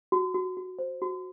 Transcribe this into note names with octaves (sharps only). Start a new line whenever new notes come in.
F#4
F#4
F#4
C5
F#4